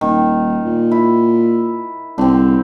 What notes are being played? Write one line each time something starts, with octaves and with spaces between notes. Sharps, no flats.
D#1 D#3
A#2
E4
C2 D3 C4